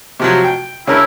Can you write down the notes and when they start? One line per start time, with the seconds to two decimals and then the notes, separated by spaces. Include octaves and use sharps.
0.20 C3 F3 F#3
0.44 G5
0.87 C#3 C#4 D4 E4 A#4